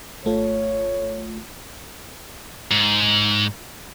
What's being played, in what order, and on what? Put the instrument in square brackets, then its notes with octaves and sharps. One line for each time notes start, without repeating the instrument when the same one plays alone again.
[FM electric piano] G#1 A3 F4 [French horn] C#5
[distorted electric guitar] G#2